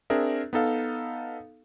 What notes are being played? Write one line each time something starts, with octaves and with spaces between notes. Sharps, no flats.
C4 D4 G#4 A#4 E5
B3 D#4 A4 F5